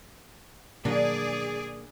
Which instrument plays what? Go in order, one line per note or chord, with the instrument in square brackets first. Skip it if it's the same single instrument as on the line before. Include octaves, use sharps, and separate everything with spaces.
[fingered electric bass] B2 D#3 F#3 [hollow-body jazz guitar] A#3 [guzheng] D4 [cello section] G#4 D5